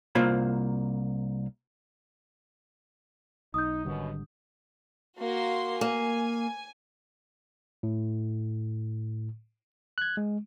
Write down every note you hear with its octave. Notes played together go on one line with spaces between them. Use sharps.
C2 A#3 F4 C5 B5
B1 D#4 D#6 G6
G#1 F#2 B2 D3 G3
A#3 F#4 C6
A#3 G#5
A2
F#6 G#6
G#3